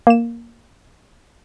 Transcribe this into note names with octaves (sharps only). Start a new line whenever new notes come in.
A#3 E7